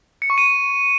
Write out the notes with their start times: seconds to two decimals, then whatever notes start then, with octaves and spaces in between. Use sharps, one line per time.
0.22 C#7
0.30 C#6
0.38 D#7